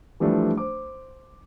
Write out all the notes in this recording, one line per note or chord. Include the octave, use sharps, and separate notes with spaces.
E3 F3 G3 A3 D4
C5 D6